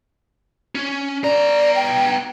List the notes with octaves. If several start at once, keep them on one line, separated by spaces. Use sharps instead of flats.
C#4
B3 D5 A#5
G5